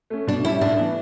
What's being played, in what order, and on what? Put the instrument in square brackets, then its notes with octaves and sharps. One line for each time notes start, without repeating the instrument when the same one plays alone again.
[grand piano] A3 C#4
[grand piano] B2 [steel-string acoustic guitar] D4
[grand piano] G3 C#4 [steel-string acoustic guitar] E4
[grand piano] A2 [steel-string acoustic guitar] D4
[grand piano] E3 B3